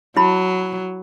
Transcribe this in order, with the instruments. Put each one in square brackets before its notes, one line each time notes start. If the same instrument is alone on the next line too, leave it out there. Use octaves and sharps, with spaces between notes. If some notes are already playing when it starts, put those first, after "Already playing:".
[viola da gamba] F#3 [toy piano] E4 B5